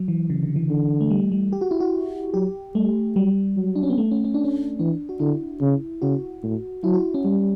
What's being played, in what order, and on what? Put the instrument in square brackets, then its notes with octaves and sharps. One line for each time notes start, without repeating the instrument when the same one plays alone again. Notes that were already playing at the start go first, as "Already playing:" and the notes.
Already playing: [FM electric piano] F#3
E3
C#3
D3
E3
[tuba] D3
[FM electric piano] A3
G3
G3
G4
F#4
E4
F#4
[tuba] F#3 [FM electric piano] G4
[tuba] G3 [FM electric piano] A3
[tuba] F#3 [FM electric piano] G3
[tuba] F#3
[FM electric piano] D4
C#4
B3
A3
C#4
C#4
D4
C#4
[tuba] E3 [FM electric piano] D4
[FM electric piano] F#4
[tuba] D3 [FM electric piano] E4
[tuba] C#3
[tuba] C#3 [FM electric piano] F#4
[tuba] A2
[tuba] F#3 [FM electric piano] E4
[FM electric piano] F#4
C#4
[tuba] G3